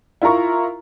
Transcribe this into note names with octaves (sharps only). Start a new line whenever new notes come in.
E4 F4 A#4 A#5 C#6